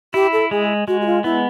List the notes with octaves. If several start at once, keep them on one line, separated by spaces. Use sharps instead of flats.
E4 G4
A4
G#3 G#4
G#3 F#4
F#4
F4
B3 E4